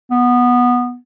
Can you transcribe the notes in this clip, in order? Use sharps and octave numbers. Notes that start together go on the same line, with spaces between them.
B3